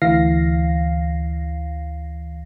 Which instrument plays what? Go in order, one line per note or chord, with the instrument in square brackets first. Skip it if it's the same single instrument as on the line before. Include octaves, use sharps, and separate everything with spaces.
[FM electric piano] D2 E3 F5 A#6 C7